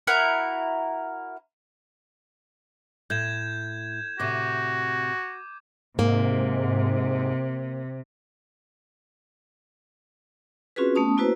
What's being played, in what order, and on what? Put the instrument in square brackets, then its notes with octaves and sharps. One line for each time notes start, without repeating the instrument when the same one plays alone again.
[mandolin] E4 F#4 A#4
[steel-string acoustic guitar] A2 [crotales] G6 G#6 E7
[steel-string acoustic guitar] A2 C3 [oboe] F#4 [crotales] D6 D#7
[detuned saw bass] G#2 [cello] C3 [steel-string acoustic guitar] A#3
[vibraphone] C4 C#4 F4 F#4 G#4 B4
A3 B3 C#4 A5 D#6
A#3 E4 F#4 B4 C5